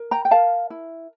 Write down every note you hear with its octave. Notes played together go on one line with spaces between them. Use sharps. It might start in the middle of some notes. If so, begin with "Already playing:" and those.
Already playing: A#4
G5 A#5
G5
A#4 F5 A5
E4